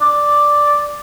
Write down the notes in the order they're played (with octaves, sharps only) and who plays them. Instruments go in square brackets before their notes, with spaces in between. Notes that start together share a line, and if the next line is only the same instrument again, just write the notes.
[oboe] D5